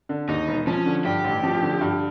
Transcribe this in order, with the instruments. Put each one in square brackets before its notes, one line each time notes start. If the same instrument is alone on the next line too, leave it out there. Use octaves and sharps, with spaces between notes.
[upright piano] D3
[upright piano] D#2 [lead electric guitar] D#4
[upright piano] E1
[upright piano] F3 [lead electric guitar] C#4
[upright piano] D3
[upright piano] G2 [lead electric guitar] G4
[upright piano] A1
F3
D3
G2